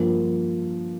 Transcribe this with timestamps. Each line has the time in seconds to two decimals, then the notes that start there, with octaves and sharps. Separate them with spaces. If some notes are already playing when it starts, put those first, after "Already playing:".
Already playing: G2 F3 A#3